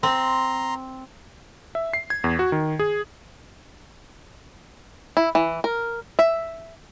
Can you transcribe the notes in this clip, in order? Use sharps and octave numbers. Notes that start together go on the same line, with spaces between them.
C4 A#5 C6
E5
C7
G#6
E2
F#4
D#3
G#4
E4
E3
A#4
E5